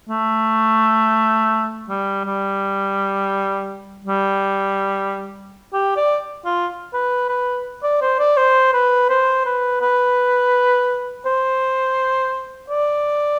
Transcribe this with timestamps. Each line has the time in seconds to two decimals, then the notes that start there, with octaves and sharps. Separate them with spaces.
0.09 A3
1.89 G3
2.25 G3
4.05 G3
5.73 G4
5.97 D5
6.45 F4
6.93 B4
7.29 B4
7.83 D5
8.01 C5
8.19 D5
8.37 C5
8.73 B4
9.09 C5
9.46 B4
9.81 B4
11.26 C5
12.70 D5